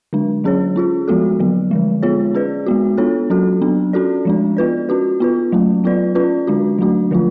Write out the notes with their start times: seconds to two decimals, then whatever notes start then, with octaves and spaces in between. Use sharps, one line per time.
0.13 D3 G#3 D4
0.44 F#3 C#4 G#4 C#5
0.76 C#4 F4 G#4
1.08 F3 G#3 B3 F#4 A4
1.39 D3 F#3 B3
1.71 D3 F3 G#3
2.03 G#3 B3 F4 G#4 C#5
2.35 C#4 G#4 B4 D5
2.66 G#3 B3 F#4
2.98 B3 D4 F4 A4 C#5
3.30 F#3 C#4 F#4 A4
3.62 F#3 B3 D4
3.93 C#4 F#4 A4 D5
4.25 F3 G#3 D4
4.57 B3 F4 B4 D5
4.89 C#4 F#4 B4
5.20 B3 F4 B4
5.52 F#3 A3 C#4
5.84 F#3 B3 F4 B4 D5
6.15 C#4 F4 B4 D5
6.47 D3 G#3 D4 F#4
6.79 F#3 A3 D4 F#4
7.11 D3 F3 A3 F4